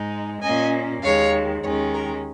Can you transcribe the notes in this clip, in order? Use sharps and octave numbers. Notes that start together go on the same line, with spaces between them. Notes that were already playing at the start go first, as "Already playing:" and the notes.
Already playing: G#2 G#3 D#4
A#2 A#3 C#4 D#5 G#5
D#2 D#3 G#3 C#5 F5
D#2 D#3 G#3 C#4 C#5
A#4